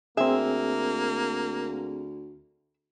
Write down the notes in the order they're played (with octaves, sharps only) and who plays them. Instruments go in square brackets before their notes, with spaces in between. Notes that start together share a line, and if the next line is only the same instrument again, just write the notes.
[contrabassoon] D2 [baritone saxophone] A#3 [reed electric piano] C4 G#4 [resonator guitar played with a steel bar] E5